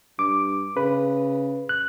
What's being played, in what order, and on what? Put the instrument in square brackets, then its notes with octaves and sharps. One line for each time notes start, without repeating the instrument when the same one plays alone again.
[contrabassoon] G2 [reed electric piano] D6
[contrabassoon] C#3 [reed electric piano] B4
[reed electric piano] F#6